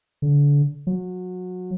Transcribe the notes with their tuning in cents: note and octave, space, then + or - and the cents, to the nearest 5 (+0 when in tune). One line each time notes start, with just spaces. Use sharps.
D3 -30
F#3 -25